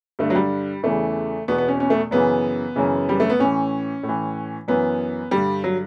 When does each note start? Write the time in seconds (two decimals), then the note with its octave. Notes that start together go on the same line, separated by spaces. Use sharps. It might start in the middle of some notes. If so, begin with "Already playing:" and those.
0.19 G2 D3 A3
0.30 F#3
0.35 G3
0.83 E2 C#3 E3 A3
1.48 E2 B2 B3
1.58 B3
1.68 C#4
1.80 C#4
1.90 A3
2.11 F#2 C#3 E3 B3
2.76 F#2 C#3 E3
3.09 G3
3.20 A3
3.30 B3
3.39 A2 E3 C#4
4.03 A2
4.09 E3
4.68 F#2 E3 B3
5.31 G2 D3 G3
5.64 F#3